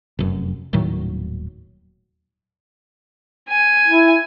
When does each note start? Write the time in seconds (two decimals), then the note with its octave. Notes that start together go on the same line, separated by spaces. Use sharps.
0.19 F1 F#2
0.73 D#1 A2 D#3 F#3
3.49 G#5
3.88 E4